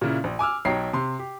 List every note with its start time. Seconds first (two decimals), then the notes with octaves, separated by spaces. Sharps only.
0.01 A#2 C#3 E4
0.24 A#1
0.39 G#5 D6 E6 F6
0.65 B1 D#4 C#5 G5 A#5 C7
0.93 C3 C6
1.19 G4